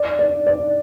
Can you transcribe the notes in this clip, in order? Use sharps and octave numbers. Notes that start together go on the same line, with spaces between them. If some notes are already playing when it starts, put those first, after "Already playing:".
Already playing: D5
D5
D5